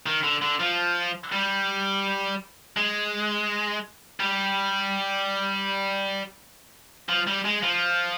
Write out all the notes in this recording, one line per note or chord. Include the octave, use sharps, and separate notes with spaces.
D#3
D3
D3
F3
G3
G#3
G3
F3
G3
G#3
F3